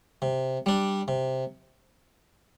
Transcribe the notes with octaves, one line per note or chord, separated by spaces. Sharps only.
C3
G3 D4
C3